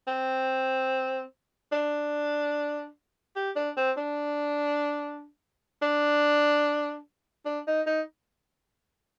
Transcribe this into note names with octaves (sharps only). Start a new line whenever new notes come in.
C4
D4
G4
D4
C4
D4
D4
D4
D#4
D#4